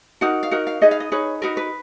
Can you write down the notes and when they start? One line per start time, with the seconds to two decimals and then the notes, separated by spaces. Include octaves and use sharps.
0.21 D#4 F#4 A#4 F#5
0.43 F5
0.51 D#4 F#4 A#4 F#5
0.67 F5
0.81 D#4 G#4 B4 D#5
0.91 F5
1.00 D#5
1.12 D#4 G#4 B4 C#5
1.42 D#4 F#4 A#4 B4
1.57 B4